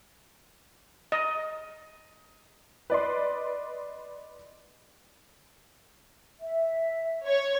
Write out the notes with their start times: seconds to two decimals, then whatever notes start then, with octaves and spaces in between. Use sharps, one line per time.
1.12 D#5
2.90 B4 D5 D#5 C6
6.40 E5
7.25 C#5